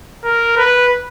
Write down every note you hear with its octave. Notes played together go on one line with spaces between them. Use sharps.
A#4
B4